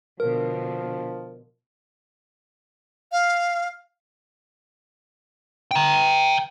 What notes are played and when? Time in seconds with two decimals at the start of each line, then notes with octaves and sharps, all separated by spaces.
0.20 B2 D3 F3 A#4
3.12 F5
5.71 G5 A#5